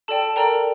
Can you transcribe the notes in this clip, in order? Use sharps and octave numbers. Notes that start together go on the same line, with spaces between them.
A4 D5 G5 A5
A5
A4 A#4 D5 G5 A#5